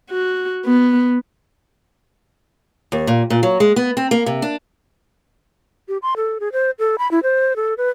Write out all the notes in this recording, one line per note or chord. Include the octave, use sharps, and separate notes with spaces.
F#4
B3
D#2
A#2
A#2
F#3
G#3
B3
C4
A#3
C3
D4
G4
C6
A4
G#4
C5
A4
B5
E4
C5
A4
B4